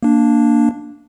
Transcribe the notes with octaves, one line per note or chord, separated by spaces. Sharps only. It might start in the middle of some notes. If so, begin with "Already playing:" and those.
A#3 D4